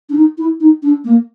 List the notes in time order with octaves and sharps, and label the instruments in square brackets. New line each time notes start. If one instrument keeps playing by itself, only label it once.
[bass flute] D4
D#4
E4
D#4
D4
A#3